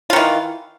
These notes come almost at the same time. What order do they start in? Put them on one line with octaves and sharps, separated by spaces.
F4 D#3 E3